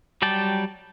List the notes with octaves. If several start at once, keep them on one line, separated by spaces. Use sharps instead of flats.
F#3 G3 D5 G5 A5